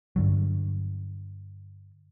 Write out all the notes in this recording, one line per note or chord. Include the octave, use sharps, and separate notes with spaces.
G2 D3 F#3